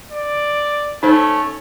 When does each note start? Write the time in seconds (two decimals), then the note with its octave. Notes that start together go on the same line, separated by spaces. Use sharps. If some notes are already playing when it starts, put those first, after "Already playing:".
0.11 D5
1.03 A3 C#4 D#4 C5